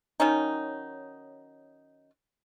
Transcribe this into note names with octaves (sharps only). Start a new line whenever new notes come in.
D#3 F#3 C#4 D#4